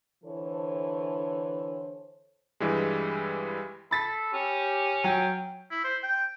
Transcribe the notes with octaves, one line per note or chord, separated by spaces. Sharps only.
D3 E3 A4 C5 C#5
G2 E3 G3 G#3
A4 B5 A6 B6
C#4 G4
F#3 G5
E4
C5
G5